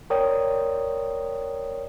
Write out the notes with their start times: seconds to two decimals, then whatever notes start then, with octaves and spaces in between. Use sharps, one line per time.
0.10 A#4 C#5 D5 G5 D#6